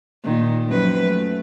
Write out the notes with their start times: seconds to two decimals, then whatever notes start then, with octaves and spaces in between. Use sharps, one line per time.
0.24 A#2 D#3
0.67 F#2 F3 B4
1.02 A3